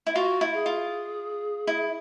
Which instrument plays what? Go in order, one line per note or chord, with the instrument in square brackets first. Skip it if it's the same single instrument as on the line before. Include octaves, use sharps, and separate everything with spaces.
[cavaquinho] E4
[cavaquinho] F4 [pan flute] F#4
[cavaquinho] E4
[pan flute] G#4
[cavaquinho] F4
E4